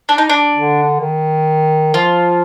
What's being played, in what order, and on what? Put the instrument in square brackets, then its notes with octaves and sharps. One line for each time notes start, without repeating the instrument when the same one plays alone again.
[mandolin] D4
D#4
D4
[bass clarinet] D3
D#3
[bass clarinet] F3 [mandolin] F4